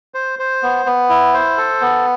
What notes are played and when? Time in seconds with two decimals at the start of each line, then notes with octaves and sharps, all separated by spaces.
0.14 C5
0.39 C5
0.63 B3
0.86 B3
1.09 E4
1.34 C5
1.57 A4
1.81 B3